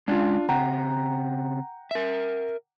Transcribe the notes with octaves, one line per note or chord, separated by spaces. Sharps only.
G#3 C#4 D4 F4
C#3 C4 F#5 G5 A#5
A#4 E5